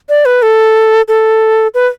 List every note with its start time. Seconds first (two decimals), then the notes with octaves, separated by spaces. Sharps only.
0.09 D5
0.25 B4
0.42 A4
1.08 A4
1.74 B4